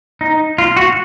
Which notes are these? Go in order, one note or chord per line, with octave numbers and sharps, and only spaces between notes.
D#4
F4
F#4